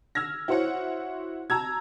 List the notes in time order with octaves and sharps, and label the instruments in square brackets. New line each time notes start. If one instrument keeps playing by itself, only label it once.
[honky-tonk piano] E6 F6 G#6 A#6
E4 F#4 C5 C#5 F#5
A5 A#5 E6 G#6